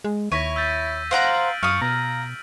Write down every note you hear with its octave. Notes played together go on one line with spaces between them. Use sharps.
G#3
D#2 E4 C#5 A#6 B6 D#7
E6 G6 A6
C5 F5 F#5 A#5 F6 D7 F#7
F#2 F5 C#6 D#6
B2 A#5